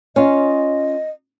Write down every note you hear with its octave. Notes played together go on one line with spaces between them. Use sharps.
C#4 F4 D#5